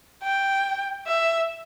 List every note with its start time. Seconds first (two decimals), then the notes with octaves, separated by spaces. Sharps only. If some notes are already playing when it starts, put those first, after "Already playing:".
0.23 G5
1.07 E5